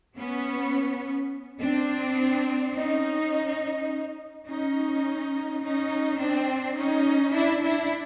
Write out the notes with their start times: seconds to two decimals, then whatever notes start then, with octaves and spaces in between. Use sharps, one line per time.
0.18 B3 C#4
1.61 C4 D4
2.75 C#4 D#4
4.47 C#4 D#4
5.61 C#4 D#4
6.18 C4 D4
6.76 C#4 D#4
7.33 D4 E4
7.62 D4 E4